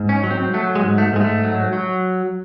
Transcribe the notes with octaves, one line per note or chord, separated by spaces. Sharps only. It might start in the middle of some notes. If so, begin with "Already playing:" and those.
Already playing: G#2
C#4
F#3
C4
F#3 A3
G#3
G#2
A3
G#2 G#3
A3
F#3
F#3